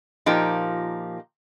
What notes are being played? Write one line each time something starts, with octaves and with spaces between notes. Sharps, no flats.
A#2 F3 A#3 D#4 G4